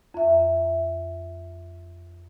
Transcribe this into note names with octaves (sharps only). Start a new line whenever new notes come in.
F2 E5